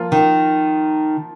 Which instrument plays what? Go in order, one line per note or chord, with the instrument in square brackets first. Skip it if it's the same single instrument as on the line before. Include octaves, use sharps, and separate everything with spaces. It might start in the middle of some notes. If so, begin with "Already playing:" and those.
Already playing: [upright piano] F3 A#3 F4
[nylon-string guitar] D#3